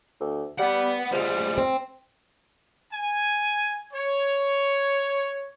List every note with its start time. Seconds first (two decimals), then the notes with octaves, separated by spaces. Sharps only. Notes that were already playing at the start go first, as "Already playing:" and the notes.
0.20 D2
0.59 G3 B3 F#5
1.12 F3 G3 G#3
1.58 C4
2.92 G#5
3.92 C#5